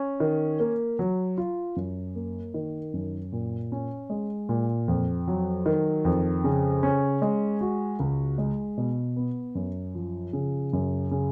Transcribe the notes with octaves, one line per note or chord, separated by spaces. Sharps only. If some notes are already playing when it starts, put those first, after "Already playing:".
Already playing: C#4
D#3
A#3
F#3
F4
F#2
A#3
D#3
F#2
A#2
C#4
G#3
A#2
F2
F#3
D#3
F2
C#3
C#4
G#3
F#4
C#2
G#3
B2
B3
F#2
F3
C#3
F#2
C#3